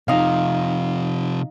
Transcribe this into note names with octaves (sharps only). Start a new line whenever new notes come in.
C3 F3 D#4 F5